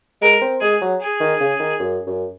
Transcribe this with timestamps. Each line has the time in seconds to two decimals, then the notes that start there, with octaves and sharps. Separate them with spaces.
0.22 G#3 A#4
0.42 C4
0.61 G#3 G#4
0.81 F#3
1.02 G#4
1.20 D#3
1.40 C#3
1.60 D#3
1.80 F#2
2.07 F#2